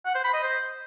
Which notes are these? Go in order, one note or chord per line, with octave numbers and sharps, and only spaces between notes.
F#5
C5
B5
D#5
C5